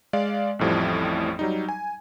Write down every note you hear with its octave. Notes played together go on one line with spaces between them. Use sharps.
G#3 D5 F5
A1 F2 A2 F3 G3
F#3 G3 D#4
G#5